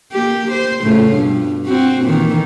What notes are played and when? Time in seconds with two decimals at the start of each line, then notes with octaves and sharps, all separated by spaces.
0.12 A#3 G4
0.51 C5
0.83 A2 C#3 F4
1.13 G2 B2
1.66 C4 F4 F#4
2.02 A#2 D#3 E3